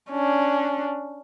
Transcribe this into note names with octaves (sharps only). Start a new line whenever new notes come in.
C#4 D4